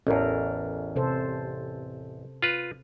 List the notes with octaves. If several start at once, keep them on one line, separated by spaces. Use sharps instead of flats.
A1 E2 C#4 A4 A#4
C3 A4 C5
F4 B4